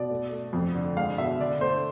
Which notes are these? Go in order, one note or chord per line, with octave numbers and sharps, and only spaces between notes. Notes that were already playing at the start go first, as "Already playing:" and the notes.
Already playing: B2 D5
A3
A3
F2
D3
G#3 F5
B2 E5
D3 D5
A3 C5